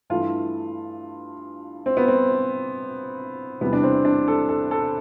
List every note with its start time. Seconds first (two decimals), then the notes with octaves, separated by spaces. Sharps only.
0.10 G2 E3 A3 F4
1.86 C4
1.97 B3
2.08 C4
3.61 E2 C3 E3 G3 B3
3.73 D4
3.83 C4
4.05 D4
4.28 A4
4.49 A4
4.71 A4